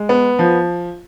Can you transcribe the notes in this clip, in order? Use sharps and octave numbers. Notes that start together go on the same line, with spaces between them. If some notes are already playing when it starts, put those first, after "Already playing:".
Already playing: G#3
B3
F3